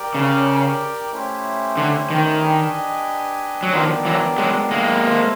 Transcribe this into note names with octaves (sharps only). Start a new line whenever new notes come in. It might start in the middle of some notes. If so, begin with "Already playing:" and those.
Already playing: G4 A#4 D5 G5
C#3
A3 C#4 E4 G4 C5
D3
D#3
D4 G4 B4 D#5 G#5
F#3
D#3 F3 B3 D4 G4 A#4 D5
E3 F#3
F#3 G#3
G#3 A#3
E4 A4 C5 F5